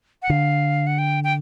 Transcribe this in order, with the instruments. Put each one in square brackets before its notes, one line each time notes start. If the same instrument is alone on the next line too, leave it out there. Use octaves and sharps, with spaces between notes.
[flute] F#5
[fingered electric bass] D3 [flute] F5
[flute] F#5
G5
G5